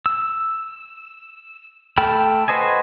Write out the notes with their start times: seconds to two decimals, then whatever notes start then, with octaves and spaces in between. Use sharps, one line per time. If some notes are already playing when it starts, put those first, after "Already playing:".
0.06 E6
1.98 A3 A4 G5 B5 F6
2.48 F#4 B4 C5 D#5 G#5